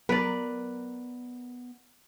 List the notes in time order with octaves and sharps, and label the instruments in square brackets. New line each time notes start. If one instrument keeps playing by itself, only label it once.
[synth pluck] F#3 [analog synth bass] B3 [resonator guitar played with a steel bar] A#4 [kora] B4 D5